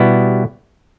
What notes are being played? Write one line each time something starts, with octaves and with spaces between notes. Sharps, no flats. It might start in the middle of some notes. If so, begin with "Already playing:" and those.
Already playing: B2 G3 B3 E4